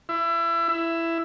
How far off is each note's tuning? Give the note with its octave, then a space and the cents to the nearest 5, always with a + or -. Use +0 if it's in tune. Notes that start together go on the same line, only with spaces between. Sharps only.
E4 +25
E4 +10